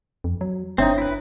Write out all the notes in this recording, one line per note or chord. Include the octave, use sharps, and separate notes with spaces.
F2
F#3
G1 C4 D4 D#4 C#5 E5
E4 B4